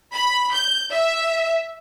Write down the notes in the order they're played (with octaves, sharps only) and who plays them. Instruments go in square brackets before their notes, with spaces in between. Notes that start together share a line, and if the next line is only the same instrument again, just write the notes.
[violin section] B5
G6
E5